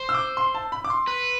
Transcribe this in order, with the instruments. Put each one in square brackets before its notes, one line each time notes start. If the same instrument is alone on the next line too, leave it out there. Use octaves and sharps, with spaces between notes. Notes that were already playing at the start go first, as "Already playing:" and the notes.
Already playing: [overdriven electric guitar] C5
[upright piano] E6
D6
C6
A5
B5
D6
C6
[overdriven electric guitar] B4